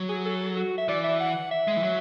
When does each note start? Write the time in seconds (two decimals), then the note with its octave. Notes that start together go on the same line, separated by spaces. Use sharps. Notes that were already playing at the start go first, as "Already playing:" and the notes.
Already playing: F#3
0.09 G#4
0.25 A4
0.57 F#4
0.78 E5
0.88 E3 D5
1.04 E5
1.20 F#5
1.51 E5
1.68 G#3
1.77 E3
1.83 F#3